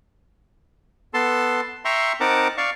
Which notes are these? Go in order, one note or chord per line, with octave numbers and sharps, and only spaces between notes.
B3 A4 A5 C6
E5 G5 A#5 C6 C#6
C4 D#4 A#4 F#5 A5 D6
D5 F5 C#6